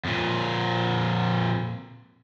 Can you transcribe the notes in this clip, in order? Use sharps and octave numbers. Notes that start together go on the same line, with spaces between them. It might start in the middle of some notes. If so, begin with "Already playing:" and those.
F2 A#2